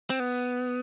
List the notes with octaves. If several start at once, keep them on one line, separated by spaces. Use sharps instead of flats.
C4
B3